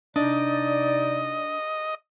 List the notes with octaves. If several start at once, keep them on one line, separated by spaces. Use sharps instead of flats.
C3 D4 D#4 D5 D#5